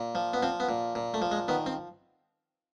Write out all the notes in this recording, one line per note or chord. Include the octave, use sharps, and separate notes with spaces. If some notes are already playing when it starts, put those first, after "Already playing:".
Already playing: A#2
F3
B3
F3 C4
B3
A#2
A#2
A3
F3
G#3
D#3 B3
C4